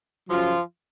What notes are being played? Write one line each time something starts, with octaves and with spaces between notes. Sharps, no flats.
F#2 C#3 F3 F#3 F4